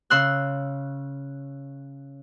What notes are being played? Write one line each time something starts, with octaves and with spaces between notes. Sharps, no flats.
C#3 C6 E6 F#6